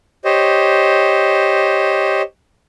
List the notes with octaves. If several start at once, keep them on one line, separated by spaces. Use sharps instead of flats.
G4 C5 C#5 D#5